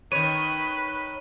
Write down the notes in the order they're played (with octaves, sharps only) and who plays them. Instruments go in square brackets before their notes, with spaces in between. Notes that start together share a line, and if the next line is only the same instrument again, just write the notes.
[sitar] D#3 C#5 [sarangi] B4 [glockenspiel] D#7